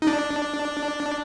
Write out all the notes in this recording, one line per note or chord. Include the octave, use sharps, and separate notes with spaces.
D#4
D4